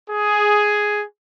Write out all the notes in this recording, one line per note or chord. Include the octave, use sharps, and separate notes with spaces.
G#4